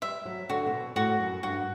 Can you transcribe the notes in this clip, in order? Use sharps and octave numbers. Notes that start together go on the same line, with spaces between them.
G3 E5
F#3
D3 F#4
C3
B2
A2 F#4
F#2
G2 F#4